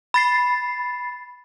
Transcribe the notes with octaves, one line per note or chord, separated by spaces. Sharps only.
B5 A6 C7